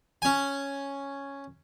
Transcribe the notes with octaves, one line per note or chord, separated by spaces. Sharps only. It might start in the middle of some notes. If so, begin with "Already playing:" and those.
C#4 G#5